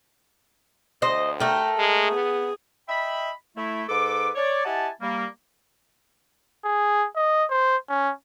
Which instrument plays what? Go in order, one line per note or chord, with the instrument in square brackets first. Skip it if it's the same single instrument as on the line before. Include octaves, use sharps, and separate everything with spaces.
[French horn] D2 [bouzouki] C5 D#5
[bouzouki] A3 A#4 [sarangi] G5
[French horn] G#3 [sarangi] G#4
[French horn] B3
[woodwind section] D#5 E5 G5 B5
A3 E4
G#2 A4 B4 D6
C#5 D5
E4 G4 D#5 F#5 G#5 A5
G3 A#3
[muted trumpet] G#4
D#5
C5
C#4